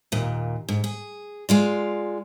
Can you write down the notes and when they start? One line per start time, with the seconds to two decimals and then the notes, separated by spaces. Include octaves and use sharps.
0.12 D#2 A#2
0.69 G#2
0.84 G#4
1.49 G#3 F4 D5